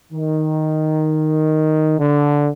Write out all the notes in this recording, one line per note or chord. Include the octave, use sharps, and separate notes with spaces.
D#3
D3